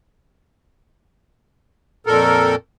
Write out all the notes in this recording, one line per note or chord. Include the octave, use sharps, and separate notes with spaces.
F2 A#2 A4 A#4